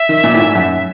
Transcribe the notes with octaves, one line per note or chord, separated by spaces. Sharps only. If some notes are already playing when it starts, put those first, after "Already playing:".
Already playing: E5
D#3
A#2
A2
G#2
F#2